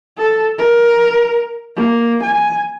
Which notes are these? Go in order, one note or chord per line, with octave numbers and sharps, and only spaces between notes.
A4
A#4
A#3
G#5